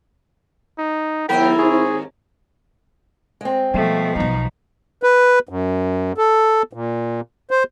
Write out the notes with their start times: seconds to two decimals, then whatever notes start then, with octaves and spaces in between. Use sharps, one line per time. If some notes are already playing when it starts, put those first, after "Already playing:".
0.79 D#4
1.29 D#2 G#2 F#3 B3 E4 A#4 G5
1.59 C4 G#4 C5 C#6
3.41 G#3 C4
3.74 B2 F3 G3 A3
4.16 B1 G3 D#4
5.03 B4
5.49 F#2
6.18 A4
6.73 A#2
7.51 C5